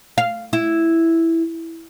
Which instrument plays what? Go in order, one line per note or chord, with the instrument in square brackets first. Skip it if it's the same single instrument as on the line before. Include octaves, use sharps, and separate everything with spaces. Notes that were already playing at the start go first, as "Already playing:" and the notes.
[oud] F5
E4